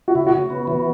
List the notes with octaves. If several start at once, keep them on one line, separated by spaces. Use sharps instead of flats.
F#4
C#3 E4
F#4
C#3
B3
E3